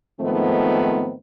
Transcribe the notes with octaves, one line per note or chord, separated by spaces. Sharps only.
G#2 D#3 F3 A3 B3 C4